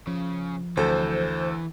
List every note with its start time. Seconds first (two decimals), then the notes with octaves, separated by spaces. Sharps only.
0.07 C#3 F3
0.77 D2 E3 A4 C5